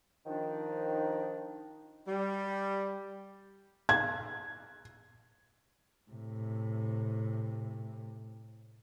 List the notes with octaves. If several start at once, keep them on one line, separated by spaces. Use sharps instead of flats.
D#3 F3 D4 D#4
G3
G#6
A2 C3